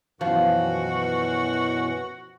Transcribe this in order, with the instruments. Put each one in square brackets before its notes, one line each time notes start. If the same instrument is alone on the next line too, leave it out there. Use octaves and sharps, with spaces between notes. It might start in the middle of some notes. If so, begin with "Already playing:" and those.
[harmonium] F#2 B2 E3 [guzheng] F3 [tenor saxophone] F#4